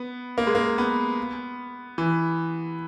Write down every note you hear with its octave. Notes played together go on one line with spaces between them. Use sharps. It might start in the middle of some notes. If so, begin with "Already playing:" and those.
Already playing: B3
A#3
G#3
A#3
B3
E3